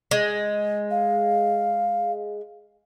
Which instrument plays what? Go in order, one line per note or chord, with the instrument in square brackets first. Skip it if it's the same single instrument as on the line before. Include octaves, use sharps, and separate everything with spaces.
[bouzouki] G#3
[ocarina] F5